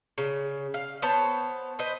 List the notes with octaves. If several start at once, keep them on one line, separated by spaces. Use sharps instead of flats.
C#3
F5
B3 C5 C#5 A5
B4 C5 D#5